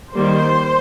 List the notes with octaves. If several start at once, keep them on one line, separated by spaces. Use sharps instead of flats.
D#3 G3 A#3 C5